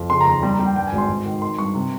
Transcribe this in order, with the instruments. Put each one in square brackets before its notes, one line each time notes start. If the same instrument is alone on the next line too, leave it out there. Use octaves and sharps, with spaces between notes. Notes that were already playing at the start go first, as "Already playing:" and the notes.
Already playing: [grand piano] F2
C#3 C6
A#5
D#2 C6
G3 C6
A#5
G3
G5
G2 G5
G#5
G#1
C6
G#1
D#3
D#3 C6
G2 C#6
C3